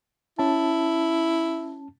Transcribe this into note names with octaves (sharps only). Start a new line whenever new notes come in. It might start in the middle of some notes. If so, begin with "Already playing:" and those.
C#4 E4 A5